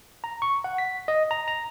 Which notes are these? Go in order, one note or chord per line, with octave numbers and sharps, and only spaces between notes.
A#5
C#6
F#5
B6
D#5
A#5
A#5